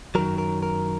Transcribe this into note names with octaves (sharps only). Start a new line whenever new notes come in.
F#2 D#3 F#3 A#4
A#4
A#4